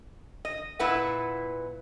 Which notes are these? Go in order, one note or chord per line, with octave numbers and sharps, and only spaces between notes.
D#5
A#2 E4 B4 F#5